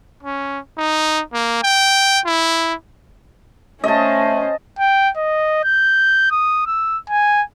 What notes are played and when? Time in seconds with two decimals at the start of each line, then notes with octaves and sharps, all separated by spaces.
0.23 C#4
0.77 D#4
1.33 A#3
1.63 G5
2.25 E4
3.84 A3 C#4 C5 D#5 A5
4.79 G5
5.17 D#5
5.64 G6
6.31 D#6
6.66 E6
7.10 G#5